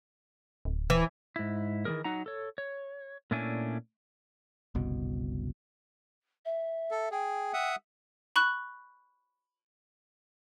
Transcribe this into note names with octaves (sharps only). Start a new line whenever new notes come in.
D1
E3
G#2 E4
D#3 E3 G3 G#4 A#4
F#3 D#4 F#5 A#5
A4 C#5
C#5
A#2 A3 C#4 D4 E4 G#5
F#1 C2 B2
E5
A4
G#4 G5
E5 F#5 D#6
B5 C#6 F#6